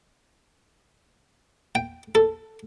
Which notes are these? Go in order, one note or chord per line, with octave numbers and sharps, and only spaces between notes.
G5
A4